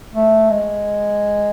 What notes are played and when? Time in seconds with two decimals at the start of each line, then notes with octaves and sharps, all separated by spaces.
0.15 A3
0.50 G#3